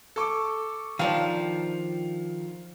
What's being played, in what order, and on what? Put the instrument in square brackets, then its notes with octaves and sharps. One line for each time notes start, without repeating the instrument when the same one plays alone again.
[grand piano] A4 C#6 D6
[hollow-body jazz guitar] D#3 F3 D4 [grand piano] F5